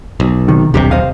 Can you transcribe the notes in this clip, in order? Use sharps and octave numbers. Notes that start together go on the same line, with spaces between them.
B1
C3 D#3
D#1 B1 C3 C4 D4 G4
C5 D#5 F5